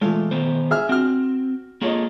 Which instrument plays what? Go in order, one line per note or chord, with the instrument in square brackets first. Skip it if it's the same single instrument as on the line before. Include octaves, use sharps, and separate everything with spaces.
[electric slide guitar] E3 G#3 [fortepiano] A3 F4 A4
[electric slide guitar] D#3 B3 C5
[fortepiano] G#4 E5 F6
[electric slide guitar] C4 [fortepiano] F#4 F6
[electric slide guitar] A#3 G#4 A4 [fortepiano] F4 C#5 D#5